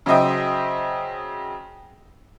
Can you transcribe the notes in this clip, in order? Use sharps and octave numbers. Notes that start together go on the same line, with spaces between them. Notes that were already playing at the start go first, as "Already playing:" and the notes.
C#3 F#3 C5 D#5 E5 G5